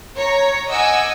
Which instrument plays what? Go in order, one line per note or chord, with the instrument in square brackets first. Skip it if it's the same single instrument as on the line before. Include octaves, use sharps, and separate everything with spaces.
[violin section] C#5 A#5
D#5 F#5 G#5 D6 E6